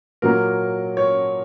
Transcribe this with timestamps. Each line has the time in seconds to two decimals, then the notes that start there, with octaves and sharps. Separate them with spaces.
0.22 A#2 F#3 A#3 A#4
0.97 C#5